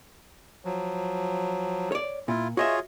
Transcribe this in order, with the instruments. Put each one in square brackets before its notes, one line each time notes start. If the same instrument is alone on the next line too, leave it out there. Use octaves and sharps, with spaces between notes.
[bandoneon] F3 F#3
[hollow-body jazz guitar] C#5 D5
[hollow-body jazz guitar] A#2 [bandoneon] E4 F4
[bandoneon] F4 G#4 C#5 [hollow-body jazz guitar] F#4 D#5 E5